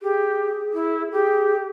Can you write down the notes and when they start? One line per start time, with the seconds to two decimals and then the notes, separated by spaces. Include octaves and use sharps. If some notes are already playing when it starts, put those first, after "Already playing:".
0.02 G4 G#4
0.73 E4
1.12 G4 G#4